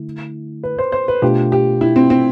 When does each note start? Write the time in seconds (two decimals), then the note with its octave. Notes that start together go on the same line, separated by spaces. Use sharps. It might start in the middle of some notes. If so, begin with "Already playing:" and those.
Already playing: D3 A3 E4
0.63 B4
0.78 C5
0.92 C5
1.08 B4
1.22 B2 A3 D4 F4 G4
1.52 G4
1.81 E4
1.96 C4
2.10 C4